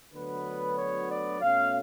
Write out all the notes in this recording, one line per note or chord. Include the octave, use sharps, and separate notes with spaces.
D2 D3 F#3 B3 B4
C#5
D5
B2 A3 C#4 F5